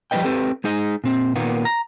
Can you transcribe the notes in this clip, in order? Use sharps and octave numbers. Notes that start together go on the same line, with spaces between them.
F3 G3 A#3 B4 D#5 G5
C4 G4 A4 B4
G#3 D#4 G#4 D#5
A#2 C4
A#2 D#3 A#3 B3
A#5